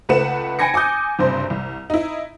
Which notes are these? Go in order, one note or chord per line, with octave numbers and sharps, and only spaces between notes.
C#2 A3 B4 F#5 E7
G5 G#5 B5 G#6 A#6 C#7
G#5 D6 D#6 G6
F#1 G2 C3 C5
C2
D#4 E4